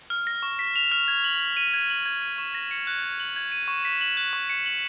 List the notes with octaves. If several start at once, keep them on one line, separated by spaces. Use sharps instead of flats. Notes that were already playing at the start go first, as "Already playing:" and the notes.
F6
A#6
C#6
B6
F7
F6
G#6
F#7
G#6
D#7
G#6
F#7
G#6
D#7
C#6
A#6
C#7
F#6
G#6
F#7
G#6
D#7
C#6
B6
F#7
F#6
C#6
C#7
F#7